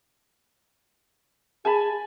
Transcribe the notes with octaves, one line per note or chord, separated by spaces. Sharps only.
G#4 G#5 A5 B5